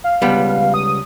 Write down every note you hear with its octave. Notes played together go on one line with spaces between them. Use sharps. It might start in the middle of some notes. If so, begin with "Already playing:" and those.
F5
C#2 G3 B3
D#6